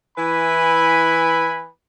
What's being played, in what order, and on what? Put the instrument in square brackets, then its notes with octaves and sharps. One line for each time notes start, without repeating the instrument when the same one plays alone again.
[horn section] E3 E4 B4 G#5 B5